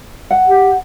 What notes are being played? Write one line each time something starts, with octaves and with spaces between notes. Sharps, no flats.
F#5
G4